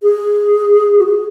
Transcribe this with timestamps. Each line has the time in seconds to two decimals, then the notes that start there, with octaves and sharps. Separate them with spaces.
0.03 G#4
0.99 F#4
1.06 G#4